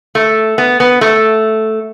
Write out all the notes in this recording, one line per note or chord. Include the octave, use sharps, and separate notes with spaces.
A3
B3
B3
A3